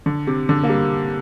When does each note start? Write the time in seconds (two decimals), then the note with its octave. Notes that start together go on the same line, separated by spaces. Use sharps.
0.06 D3
0.27 C3
0.49 D3
0.63 A#3
0.69 G3